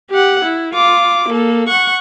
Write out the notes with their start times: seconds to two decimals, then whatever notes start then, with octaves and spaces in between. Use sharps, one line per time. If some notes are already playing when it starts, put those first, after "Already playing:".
0.11 G4 F#5
0.44 E4
0.74 F4 D6
1.28 A#3 A4
1.68 F#5 C#6